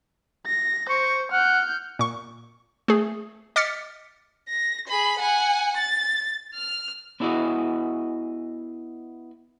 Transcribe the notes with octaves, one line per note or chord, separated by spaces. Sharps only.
A#6
C5 C#6
F#5 F6 G6
A#2 C#6
A3 G#4
D#5 D6 F6 A6 B6 C#7
A#6
G#4 B5
F#5 G#5
A6
F6
B3 D4 E4 F#4 G#4 D#5